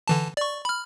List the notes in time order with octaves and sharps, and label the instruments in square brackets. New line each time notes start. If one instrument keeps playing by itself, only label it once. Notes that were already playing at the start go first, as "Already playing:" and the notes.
[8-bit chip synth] D3 E3 A5
D5 C#6
B5 F6